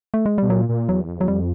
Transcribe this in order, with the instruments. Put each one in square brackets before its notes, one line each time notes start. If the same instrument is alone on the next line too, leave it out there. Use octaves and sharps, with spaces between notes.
[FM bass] A3
G#3
[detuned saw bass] B2 [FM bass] G3
[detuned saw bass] A#2 [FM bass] F#3
[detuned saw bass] A#2
[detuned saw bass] E2 [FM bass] F#3
[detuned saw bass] F2
[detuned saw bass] E2 [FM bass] F#3
[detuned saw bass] F2 [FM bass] G3